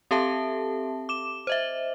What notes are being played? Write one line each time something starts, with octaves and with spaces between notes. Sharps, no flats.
C4 G4 A4 E5 A5
D6 E7
C5 D#5 E5